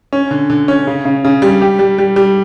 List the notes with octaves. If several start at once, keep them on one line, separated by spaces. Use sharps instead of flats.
C#4
D3
D3
C#4
C#3
C#3
C#3
G3
G4
G3
G3
G3